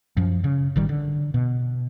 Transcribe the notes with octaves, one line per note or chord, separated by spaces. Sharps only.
F#2 F3
C#3
G#1 D#3 G3
D3
B2